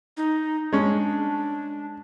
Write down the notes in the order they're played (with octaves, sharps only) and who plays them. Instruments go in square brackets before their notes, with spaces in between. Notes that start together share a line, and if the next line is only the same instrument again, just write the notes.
[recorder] D#4
[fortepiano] G#3 C#4 [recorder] D4